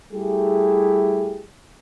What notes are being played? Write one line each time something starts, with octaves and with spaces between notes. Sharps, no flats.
G3 A3 E4 G4 G#4